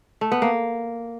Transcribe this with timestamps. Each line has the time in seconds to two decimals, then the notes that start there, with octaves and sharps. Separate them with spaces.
0.21 A3
0.32 B3
0.42 A#3